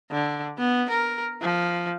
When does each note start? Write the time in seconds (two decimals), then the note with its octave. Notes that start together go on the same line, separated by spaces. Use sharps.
0.11 D3
0.58 B3
0.90 A#4
1.41 F3